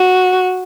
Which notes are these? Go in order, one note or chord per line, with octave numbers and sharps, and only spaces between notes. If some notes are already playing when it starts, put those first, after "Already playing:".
Already playing: F#4